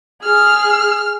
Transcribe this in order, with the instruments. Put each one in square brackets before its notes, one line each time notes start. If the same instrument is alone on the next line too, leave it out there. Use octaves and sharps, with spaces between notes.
[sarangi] G#4 [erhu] F6